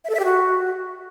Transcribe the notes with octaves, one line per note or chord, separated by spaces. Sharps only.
E5
A4
E5
G4
F#4